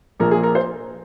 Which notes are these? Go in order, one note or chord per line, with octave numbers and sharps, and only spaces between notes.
A#1 A#2 F3 A#3 A#4
G#4
A#4
C5